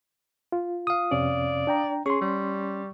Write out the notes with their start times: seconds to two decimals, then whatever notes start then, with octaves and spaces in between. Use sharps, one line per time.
0.52 F4
0.87 F5 D#6
1.11 F2 C3 C#4 D5
1.67 D4 G5 A#5
2.06 C#4 G#4 C6 C#6
2.21 G3